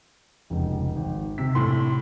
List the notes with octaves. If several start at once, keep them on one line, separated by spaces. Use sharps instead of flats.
F1 C#2
G#1
C3 E6 B6
A2 C6